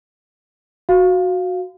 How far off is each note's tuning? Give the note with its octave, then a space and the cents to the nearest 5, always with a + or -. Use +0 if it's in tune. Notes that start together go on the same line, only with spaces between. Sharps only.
F#4 -10 F5 +0